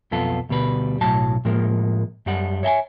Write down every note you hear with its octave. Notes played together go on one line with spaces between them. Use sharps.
B1 F2 B3 F4 A4
D2 B2 G3 B4
B1 A2 F#3 A5
A2 F3 G#3 A#3
F#2 G3 F#5
C#5 E5 G5 G#5